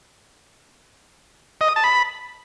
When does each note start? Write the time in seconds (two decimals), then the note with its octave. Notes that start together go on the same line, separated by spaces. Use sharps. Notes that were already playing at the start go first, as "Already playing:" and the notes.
1.61 D#5
1.68 D#6
1.76 A5
1.84 B5